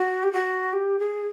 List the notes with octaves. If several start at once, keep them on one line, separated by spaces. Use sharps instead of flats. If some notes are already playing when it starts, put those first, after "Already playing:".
Already playing: F#4
G4
F#4
G4
G#4